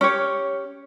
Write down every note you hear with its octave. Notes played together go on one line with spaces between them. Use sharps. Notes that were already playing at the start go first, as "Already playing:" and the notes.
C#4 G4 C#5